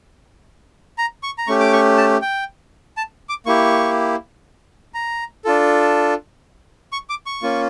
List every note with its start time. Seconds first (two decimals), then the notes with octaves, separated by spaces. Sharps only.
0.98 A#5
1.23 C#6
1.38 A#5
1.47 A3 C#4 G4 C#6
1.60 D6
1.73 C#6
1.97 A5
2.22 G5
2.97 A5
3.29 D6
3.46 A#3 E4 G4 C#6
4.94 A#5
5.45 D4 F4 A4
6.92 C#6
7.10 D6
7.26 C#6
7.42 A#3 C#4 F4